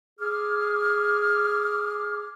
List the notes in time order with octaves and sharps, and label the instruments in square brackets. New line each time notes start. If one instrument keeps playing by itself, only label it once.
[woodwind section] G#4 D6 F6